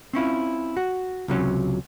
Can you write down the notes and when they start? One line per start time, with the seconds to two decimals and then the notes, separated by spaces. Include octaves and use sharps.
0.13 C4 C#4 E4 F4
0.77 F#4
1.28 C#2 C3 F#3 C#4